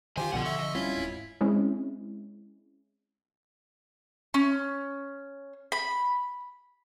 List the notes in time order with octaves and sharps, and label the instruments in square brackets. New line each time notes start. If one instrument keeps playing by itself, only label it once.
[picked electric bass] D#3 [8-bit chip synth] F4 G4 C5 [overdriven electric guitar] G#5
[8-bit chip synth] B1 B2 [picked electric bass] D3 F3 [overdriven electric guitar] A4 F#5
[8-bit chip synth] E5 C#6
[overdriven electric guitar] D#5
[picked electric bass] D1 G3 C4 [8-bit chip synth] C#4 F4 [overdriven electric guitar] E4
[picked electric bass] D#1 G#2
[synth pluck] G#3 C4 C#4 E4
[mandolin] C#4
B5